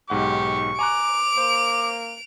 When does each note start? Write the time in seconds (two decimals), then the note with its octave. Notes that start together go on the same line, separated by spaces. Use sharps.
0.10 B1 G#2 G4 F#5 C#6
0.79 G#5 A#5 D6 F#6 D7 F7
1.38 A#3 C5